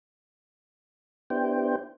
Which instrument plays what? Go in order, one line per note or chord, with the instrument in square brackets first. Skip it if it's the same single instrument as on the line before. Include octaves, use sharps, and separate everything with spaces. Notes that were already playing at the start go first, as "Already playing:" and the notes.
[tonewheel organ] B3 D4 E4 G4 C5 G5